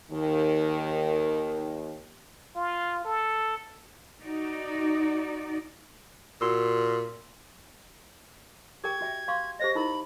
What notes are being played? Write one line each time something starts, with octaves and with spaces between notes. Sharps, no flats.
D#2 D#3
F4
A4
D#4 F#4 D5
A#2 F#4 C6 E6
G4 A#4 G5 G#6
F#4 E5 G5
F5 C6 C#6
G4 C5 D#5 A#6
D#4 E4 A#4 B5